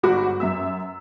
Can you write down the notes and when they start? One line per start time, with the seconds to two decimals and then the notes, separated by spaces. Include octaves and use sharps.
0.03 G1 G#2 F#4 B5 D6
0.40 F#2 E5 E6